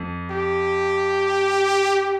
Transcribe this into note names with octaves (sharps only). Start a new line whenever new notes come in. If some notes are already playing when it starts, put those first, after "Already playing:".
Already playing: F2
G4